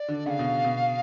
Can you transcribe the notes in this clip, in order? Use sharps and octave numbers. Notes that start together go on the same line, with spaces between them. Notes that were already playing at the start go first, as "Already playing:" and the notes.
Already playing: D5
D3
C#3 F5 F#5
B2
B2